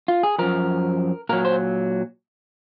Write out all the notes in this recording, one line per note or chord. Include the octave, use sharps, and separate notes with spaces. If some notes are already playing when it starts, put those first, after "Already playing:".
F4
G#4
F#2 F3 A#4
A#2 F#3 A#4
C5